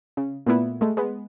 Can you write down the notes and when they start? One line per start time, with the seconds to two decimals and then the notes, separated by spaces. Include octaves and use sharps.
0.17 C#3
0.46 A#2 A3 B3 E4
0.81 G#3 A3
0.97 G#3 B3